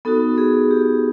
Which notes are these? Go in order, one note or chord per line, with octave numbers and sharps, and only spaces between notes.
B3 D#4 F#4 A4
G#4
G4